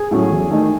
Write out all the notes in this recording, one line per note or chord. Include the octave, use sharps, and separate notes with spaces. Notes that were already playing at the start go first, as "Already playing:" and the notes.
Already playing: G#4 G#5
A2 F#3 A3 C#4
E2
D#3 A3 D#4